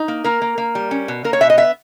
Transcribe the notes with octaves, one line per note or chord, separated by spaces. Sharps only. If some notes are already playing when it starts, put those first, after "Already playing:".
Already playing: D#4
A#3
A#3 A#4
A#3
A#3
G3
C#4
B2
A#3 A#4
C#5
B2 E5
D#5
B3 E5